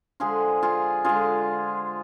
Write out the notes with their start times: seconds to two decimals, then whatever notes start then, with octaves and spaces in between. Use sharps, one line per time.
0.20 D3 F3 G#3 F4 G#4
0.63 F4 G#4
1.04 D3 G#3 F4 G#4